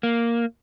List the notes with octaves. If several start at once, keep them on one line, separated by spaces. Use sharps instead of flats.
A#3